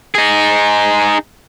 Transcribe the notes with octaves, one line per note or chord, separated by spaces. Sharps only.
D#4 G#4